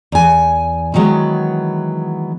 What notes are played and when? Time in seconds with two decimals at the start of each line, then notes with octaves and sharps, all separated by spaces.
0.12 E2 G#5
0.94 D#3 E3 F#3 G#3 B3